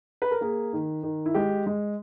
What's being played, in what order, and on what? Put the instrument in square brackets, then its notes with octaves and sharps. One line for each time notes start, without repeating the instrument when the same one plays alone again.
[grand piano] B4
A#4
A#3 G#4
D#3
D#3
E4
G#3 G4
G#3